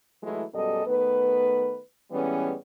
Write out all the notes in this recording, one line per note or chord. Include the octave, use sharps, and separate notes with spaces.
E3 F#3 G#3 A3 E4
F#2 B2 G3 G#3 A4 D#5
D#3 A3 B3 B4
A2 E3 G3 G#3 B3 C#4